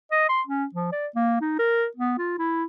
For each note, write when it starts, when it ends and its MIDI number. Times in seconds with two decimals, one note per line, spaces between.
0.11 0.28 75
0.29 0.42 84
0.47 0.65 61
0.74 0.89 53
0.92 1.07 74
1.15 1.38 58
1.41 1.55 63
1.59 1.85 70
1.97 2.16 59
2.18 2.36 65
2.39 2.64 64